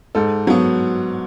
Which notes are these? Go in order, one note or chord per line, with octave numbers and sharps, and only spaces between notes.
G#2 A4
F#3 B3